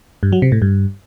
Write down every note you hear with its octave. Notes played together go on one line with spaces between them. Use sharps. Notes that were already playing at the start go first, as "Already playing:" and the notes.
G2
F#3
C3
A2
G2